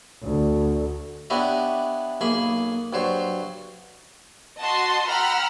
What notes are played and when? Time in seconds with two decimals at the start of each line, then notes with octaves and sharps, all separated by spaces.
0.23 D2
1.30 B3 D4 E4 G4 C#5 D#5
2.21 B1 A#3 G#4 B5
2.93 G2 F#3 C5 C#5
4.61 F#4 D#5 A5 C6
5.10 F#5 G5 A#5 B5 E6 F6